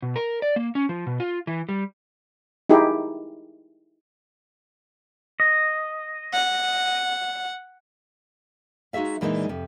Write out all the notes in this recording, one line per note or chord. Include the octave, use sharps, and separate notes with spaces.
B2
A#4
D5
A#3
C#4
F3
B2
F4
E3
G3
D#4 E4 G4 G#4
D#5
F#5
G#3 D#4 F#4 G#4 E5 F5
A#2 E3 G#3 B3 D4 D#4
F2 C3